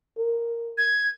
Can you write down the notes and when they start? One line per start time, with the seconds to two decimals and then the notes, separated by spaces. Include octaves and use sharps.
0.18 A#4
0.78 G#6